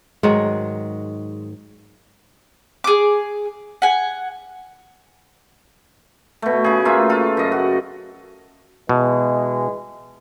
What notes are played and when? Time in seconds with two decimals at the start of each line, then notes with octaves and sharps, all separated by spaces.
0.23 G#2 D#3 F#3 G#3
2.84 G#4 D6
3.82 F#5 G#5
6.42 B2 A3
6.64 C#3 G#4
6.85 A3 A#3 F4 E5
7.09 F4 A4
7.37 F#2 D#5
7.52 F#4
8.89 B2 E3 G#3